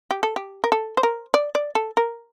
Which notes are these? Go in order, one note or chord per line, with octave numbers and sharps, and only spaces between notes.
G4
A4
G4
A#4
A4
C5
A#4
D5
D5
A4
A#4